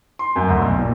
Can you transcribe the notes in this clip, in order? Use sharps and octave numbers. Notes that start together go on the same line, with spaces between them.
C6
F#2
D2
B1
A#2